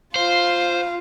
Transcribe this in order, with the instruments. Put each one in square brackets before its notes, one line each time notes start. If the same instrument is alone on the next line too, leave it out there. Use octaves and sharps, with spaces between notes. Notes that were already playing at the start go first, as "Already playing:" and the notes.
[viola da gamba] F4 [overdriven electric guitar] C5 [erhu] F5